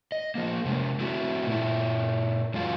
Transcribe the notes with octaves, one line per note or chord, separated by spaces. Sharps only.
D#5
F3 A#3
C3 G#3
A3 C4 E4 F#4 A4
A#2 E4
F#2 F#3 G#3 F4 F5